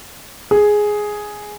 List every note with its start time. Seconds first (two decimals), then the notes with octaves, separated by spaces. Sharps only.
0.51 G#4